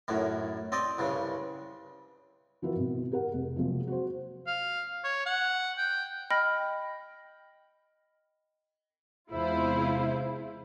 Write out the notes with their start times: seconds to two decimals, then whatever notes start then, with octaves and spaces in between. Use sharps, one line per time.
0.08 F#2 A2 D#3
0.72 C4 D5 D#5
0.98 C2 G2 C#3
2.62 E3 F3 E4 F#4 A#4 B4
2.76 G#1 B2
3.12 G4 G#4 A#4 F#5
3.33 F1
3.56 C3 F3 F#3 G#3 A#3
3.87 F#4 C5
4.47 F5
5.04 C#5
5.26 F#5
5.78 G5
6.30 D#5 G5 B5 F6 A#6
9.32 E2 C3 G#3 E4 F4 C5